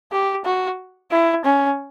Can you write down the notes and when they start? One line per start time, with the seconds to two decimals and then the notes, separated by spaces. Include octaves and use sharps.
0.12 G4
0.45 F#4
1.11 E4
1.45 C#4